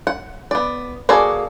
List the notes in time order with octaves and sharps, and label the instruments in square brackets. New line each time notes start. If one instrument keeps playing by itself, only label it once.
[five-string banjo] F#5
B3 D5
A#3 F#4 G#4 A4 D5